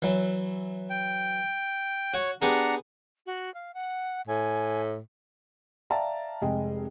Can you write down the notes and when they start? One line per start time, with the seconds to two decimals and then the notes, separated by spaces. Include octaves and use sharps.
0.02 E3 F#3
0.90 G5
2.14 F#4 C#5
2.42 B3 D4 G4 G#4 F#5 A#5
3.26 F#4
3.54 F5
3.74 F#5
4.27 A2 G#5
5.90 D5 E5 F5 G5 A5 A#5
6.41 F1 G#3 G#4 D#5 G5